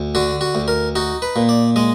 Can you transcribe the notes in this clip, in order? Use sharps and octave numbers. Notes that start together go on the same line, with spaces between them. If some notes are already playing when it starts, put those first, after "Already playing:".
Already playing: D2
D3 F#4
F#4
D2
A#4
D#4 F#4
B4
A#2
D5
G#3 D#5